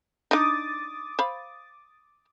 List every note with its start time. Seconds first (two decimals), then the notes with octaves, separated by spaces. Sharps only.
0.31 D4 D#4 D6 D#6 A6
1.19 C5 F5 B5